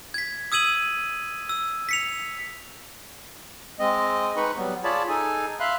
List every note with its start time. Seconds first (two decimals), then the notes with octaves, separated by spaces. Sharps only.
0.14 G#6 B6
0.52 D#6 E6 G#6 D#7 F#7
1.49 E6
1.89 B6 C#7 F7
3.80 G#3 C4 D#5
4.37 G#3 D#4 B4 B5 C#6
4.57 F#3 G3 B3
4.84 F4 G#4 C#5 D5 A5 B5
5.09 D#4 G#4 A4 G#5
5.60 E5 F5 B5 C6 F#6